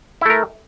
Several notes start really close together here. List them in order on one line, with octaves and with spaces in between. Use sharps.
E4 A3 A#4